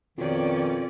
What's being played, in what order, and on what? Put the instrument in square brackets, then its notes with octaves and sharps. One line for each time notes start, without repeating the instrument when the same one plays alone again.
[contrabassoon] F2 [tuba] B2 [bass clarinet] D#3 [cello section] C#4 D5